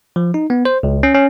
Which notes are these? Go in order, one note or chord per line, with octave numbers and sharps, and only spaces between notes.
F3
D#4
B3
C5
C#2
C#4
C#4